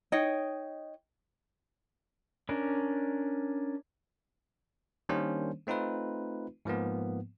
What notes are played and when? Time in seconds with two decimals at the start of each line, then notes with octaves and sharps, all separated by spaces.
0.12 D#4 C#5 D#5 G5
2.49 C#4 D4 A#4
5.09 D#3 G3 A#3 C#4 D4 C5
5.67 A3 C4 D#4 F4 B4
6.65 G#2 F3 A#3 B3